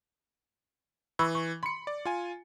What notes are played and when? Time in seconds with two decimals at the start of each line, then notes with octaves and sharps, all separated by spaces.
1.19 E3 B5 C#6 E6
1.35 C#6
1.63 B5 C6 C#7
1.87 D5
2.05 F4 G#5